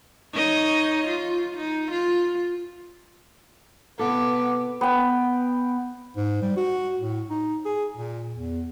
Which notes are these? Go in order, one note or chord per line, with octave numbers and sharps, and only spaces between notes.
D#4 C#5 D#5
F4
D#4
F4
C3 B3 E4 A4 D6
B3 G5
G#2
G3
F#4
A2
D#4
G#4
A#2
E2